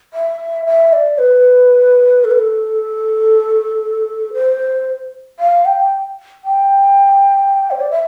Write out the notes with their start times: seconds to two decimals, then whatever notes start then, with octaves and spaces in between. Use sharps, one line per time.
0.14 E5
0.66 E5
0.93 D5
1.18 B4
2.24 A4
2.31 B4
2.39 A4
4.34 C5
5.39 F5
5.65 G5
6.44 G5
7.71 C5
7.80 D5
7.91 E5